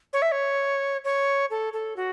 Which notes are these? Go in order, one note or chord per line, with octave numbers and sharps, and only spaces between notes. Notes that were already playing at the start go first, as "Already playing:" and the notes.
C#5
E5
C#5
C#5
A4
A4
F#4